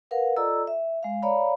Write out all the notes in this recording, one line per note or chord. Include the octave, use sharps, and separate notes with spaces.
A#4 B4 F5 F#5
F4 A4 D5 D#5 A#5 E6
E5
G#3 F5
C#5 D5 F5 A#5 B5